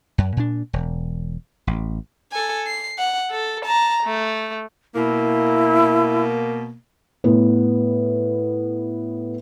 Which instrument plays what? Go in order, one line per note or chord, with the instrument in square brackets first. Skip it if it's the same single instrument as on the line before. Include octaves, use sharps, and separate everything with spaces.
[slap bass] F#2
A#2 D4
E1
A1
[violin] A4 G#5
C7
F#5
A4
A5 A#5
A3
[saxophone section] B2 A#3 [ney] E4
[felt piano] A2 B3